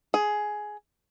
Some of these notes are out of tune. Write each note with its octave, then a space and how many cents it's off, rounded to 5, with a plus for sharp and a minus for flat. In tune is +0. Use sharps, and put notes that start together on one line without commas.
G#4 +10